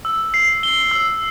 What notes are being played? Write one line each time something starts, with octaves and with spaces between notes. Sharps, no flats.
E6
C7
G7
E6